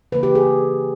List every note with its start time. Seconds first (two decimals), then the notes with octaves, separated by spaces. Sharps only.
0.12 C#3 E3 A#3 B4
0.23 G4
0.35 G#4